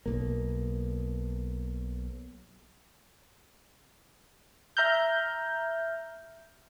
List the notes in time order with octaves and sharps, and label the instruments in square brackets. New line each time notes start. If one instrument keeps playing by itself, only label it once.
[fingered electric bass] B1 A#3
[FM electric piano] E5 A#5 F6 G6